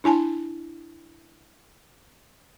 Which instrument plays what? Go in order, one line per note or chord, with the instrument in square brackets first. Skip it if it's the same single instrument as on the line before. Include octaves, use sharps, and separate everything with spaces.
[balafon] D4 E4 G#5 A5